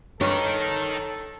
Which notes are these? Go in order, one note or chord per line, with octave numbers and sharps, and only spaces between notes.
G2 D#4 A4 A#4 C#5